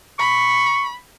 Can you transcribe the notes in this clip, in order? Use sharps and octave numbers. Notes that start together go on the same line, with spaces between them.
B5 C#6